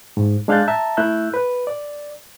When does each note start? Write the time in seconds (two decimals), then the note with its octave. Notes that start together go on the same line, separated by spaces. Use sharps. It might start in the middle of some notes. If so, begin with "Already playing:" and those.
0.17 G#2
0.48 G#3 D4 F5 F#6 G6 A6
0.68 E5 A5 A#5
0.97 A3 E4 E5 E6 F#6 G6
1.34 B4
1.67 D5